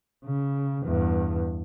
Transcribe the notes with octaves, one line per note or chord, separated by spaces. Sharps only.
C#3
E2 G2